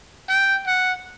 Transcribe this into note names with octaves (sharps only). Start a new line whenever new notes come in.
G5
F#5